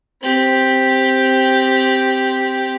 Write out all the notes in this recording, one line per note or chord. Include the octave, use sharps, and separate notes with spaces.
C4 G4